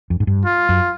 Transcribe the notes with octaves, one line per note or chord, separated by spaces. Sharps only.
F2
G#2
G2
F4
F#2